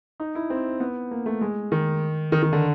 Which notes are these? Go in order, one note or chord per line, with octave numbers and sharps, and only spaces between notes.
D#4
E4
C4
B3
A#3
A3
G#3
D#3
D#3
D#3
D3